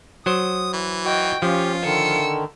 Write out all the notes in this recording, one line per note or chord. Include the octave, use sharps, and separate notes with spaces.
F#3 C5 D#6
E3
F#4 D#5 G5
F3 C#4 F4 G4
D3 D#3 E6 C#7